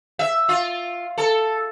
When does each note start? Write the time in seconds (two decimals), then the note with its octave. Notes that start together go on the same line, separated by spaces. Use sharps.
0.19 E5
0.49 F4
1.18 A4